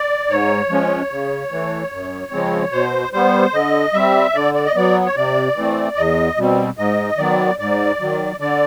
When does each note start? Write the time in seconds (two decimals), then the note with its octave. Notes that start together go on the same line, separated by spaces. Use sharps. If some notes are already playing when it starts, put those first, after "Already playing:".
Already playing: D5
0.29 G#2 C#5
0.69 F3 G#3 C#4
1.11 C#3
1.51 E3 A3
1.92 F#2
2.32 C#3 F3 G#3 C4
2.72 B2 C5
3.13 G3 B3 C5
3.53 D3 D#5
3.94 G3 C4 E5
4.34 D3 D5
4.54 D5
4.66 D#5
4.75 F#3 B3 D5
5.06 C#5
5.16 C3 D5
5.56 E3 A3 C4
5.97 E2 D#5
6.37 B2 G3 C4
6.78 G#2 D#5
7.18 D#3 F#3 B3 D5
7.59 G#2 D5
8.00 D#3 F#3
8.40 D3 D5